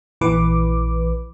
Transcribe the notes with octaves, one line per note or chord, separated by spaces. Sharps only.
A#1 E3 B4 D6